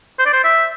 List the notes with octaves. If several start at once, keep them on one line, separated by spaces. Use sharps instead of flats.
C5
D5
C5
E5